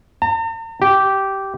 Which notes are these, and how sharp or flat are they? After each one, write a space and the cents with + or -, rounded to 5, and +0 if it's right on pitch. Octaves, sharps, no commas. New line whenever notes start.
A#5 -45
G4 -10